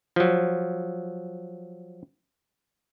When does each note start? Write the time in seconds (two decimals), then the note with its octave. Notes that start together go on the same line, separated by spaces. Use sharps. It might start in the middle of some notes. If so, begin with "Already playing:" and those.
0.16 F3 F#3